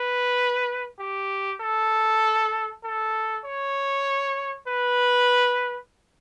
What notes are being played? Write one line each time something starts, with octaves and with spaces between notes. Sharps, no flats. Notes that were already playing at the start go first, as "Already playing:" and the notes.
Already playing: B4
G4
A4
A4
C#5
B4